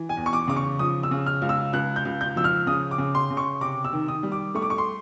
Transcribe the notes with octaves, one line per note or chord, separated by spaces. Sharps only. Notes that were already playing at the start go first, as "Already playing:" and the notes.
Already playing: E3
G#5
E2
C#6
D6
C#3 D6
C#6
F3 D#6
E6
C#3
F6
C#2
E6
C#2 F#6
G6
C#2
G6
F3 E6
F6
C#3 D#6
D6
C#3
C6
C#3
C#6
C3 D6
E6
D#3
D#6
G3
D6
A3 C#6
D6
C#6
C6